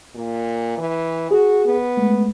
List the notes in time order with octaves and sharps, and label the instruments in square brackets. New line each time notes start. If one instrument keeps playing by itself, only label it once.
[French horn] A#2
E3
[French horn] F#4 [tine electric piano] G#4
[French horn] B3
[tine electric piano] G#3 A3